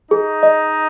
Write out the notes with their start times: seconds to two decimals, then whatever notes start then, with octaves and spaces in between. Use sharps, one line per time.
0.11 D#4 G#4
0.43 D#5